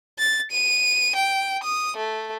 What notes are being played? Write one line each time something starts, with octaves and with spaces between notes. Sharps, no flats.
A6
D#7
G5
D#6
A3